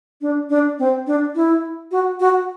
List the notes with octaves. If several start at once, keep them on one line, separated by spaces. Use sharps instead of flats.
D4
D4
C4
D4
E4
F#4
F#4